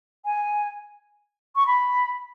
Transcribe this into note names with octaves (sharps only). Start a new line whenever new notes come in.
G#5
C#6
B5